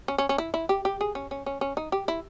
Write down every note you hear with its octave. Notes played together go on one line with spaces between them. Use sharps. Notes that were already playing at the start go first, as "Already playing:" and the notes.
C#4
C#4
C#4
E4
E4
G4
G4
G#4
C#4
C#4
C#4
C#4
D#4
G4
E4